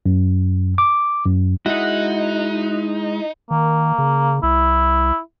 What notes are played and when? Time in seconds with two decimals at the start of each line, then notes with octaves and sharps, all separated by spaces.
0.06 F#2
0.78 D6
1.26 F#2
1.66 G#3 D#4 E4 F#4 F#5
3.51 D#3 A#3
3.98 C#3
4.43 C2 E4